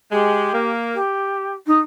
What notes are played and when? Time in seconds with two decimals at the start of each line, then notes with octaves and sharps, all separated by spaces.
0.11 G#3 G4
0.53 A#3
0.94 G4
1.66 D#4